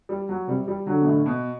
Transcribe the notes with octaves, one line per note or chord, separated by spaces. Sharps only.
G3
F#3
C3 G3
G3
D3 F#3
B2
A2
B2